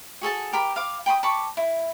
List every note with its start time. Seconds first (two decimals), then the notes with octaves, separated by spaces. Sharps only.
0.21 F#4 G#4 A4 A5
0.52 G4 A#4 B5
0.76 F5 D6
1.06 G5 B5 C6 D#6
1.23 A5 B5 C#6 D6
1.57 E4